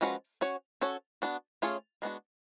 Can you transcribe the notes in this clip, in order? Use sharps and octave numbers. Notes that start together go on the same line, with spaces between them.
F3 G#3 C#4 F#4 B4
C#4 F#4 C#5
C#4 F#4 A4 C#5
B3 D4 F#4
A3 C#4 F4 G#4 C#5
G#3 B3 D4 F#4